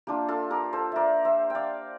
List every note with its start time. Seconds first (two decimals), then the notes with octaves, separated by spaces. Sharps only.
0.07 A#3 D4 F4 G4
0.28 F4 A4
0.50 G4 A#4
0.73 A4 C5
0.92 A#4 D5 E5
1.25 C5 E5
1.50 D5 F5 G5